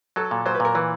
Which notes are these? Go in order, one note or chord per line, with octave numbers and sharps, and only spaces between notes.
F#3 A4
A#2
F#3 C5
B4
A#2 A#4
E3 B4